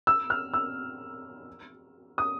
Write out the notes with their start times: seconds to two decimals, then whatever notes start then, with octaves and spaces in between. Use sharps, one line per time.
0.07 E6
0.30 F6
0.54 E6
2.18 D#6